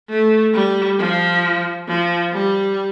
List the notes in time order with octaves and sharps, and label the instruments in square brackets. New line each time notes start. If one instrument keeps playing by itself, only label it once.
[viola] A3
G3
F3
F3
G3